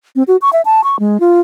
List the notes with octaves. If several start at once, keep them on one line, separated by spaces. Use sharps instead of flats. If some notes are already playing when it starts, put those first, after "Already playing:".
C4
F#4
C#6
E5
A5
C#6
G#3
F4